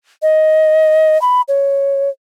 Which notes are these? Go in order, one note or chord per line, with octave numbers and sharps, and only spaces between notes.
D#5
B5
C#5